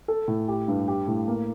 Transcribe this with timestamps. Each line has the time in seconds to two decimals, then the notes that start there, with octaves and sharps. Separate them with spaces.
0.08 A4
0.28 A2
0.48 G4
0.68 G2
0.88 G4
1.08 A2
1.28 A#3